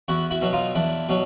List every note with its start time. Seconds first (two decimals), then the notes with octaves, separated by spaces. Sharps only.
0.08 E2 E4 F#4
0.31 E4 F#4
0.42 B2 F#3
0.53 D#4 F4
0.75 E2 D4 E4
1.09 B2 F#3